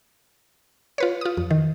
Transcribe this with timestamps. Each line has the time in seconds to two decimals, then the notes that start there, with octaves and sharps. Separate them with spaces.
0.98 F4 B4 C#5
1.21 F4 D#6
1.37 F2
1.51 D#3